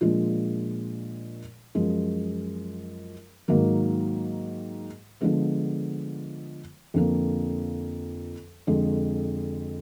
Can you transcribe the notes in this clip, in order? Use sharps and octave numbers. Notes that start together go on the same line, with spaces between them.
A#2 F3 G#3 D4 F4
F#2 F3 G#3
G#2 D#3 F#3 A#3
D3 F3 G#3 B3
F2 D3 F3 A#3
F2 D3 G#3